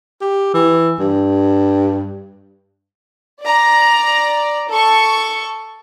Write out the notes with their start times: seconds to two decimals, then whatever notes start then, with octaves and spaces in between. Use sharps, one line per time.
0.21 G4
0.54 E3
0.99 G2
3.43 D5 A#5
4.69 A4 C#6